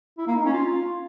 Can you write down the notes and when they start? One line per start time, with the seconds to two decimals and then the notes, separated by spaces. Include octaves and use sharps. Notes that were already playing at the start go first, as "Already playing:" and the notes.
0.18 E4
0.27 A#3
0.36 D#4
0.45 C#4
0.54 F4